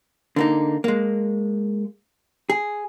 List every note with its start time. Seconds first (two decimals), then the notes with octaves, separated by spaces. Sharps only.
0.36 D3 A#3 D#4
0.84 G#3 A#3
2.50 G#4